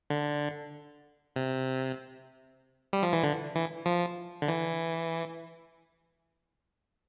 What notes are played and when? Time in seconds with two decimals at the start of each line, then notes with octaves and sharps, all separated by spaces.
0.10 D3
1.36 C3
2.93 G3
3.03 F3
3.13 E3
3.23 D3
3.55 E3
3.86 F3
4.42 D3
4.48 E3